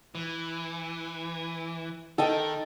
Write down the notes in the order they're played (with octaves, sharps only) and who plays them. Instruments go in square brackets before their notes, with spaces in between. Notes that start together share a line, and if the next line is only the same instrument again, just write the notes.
[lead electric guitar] E3
[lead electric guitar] D#3 [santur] A4 D#5 G5